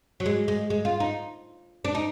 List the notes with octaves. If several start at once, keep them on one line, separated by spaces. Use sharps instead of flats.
F#3
G#3
G#3
G#3
F4
D#4
D4
D#4